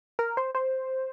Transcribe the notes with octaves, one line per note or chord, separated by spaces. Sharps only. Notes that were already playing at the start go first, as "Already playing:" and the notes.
A#4
C5
C5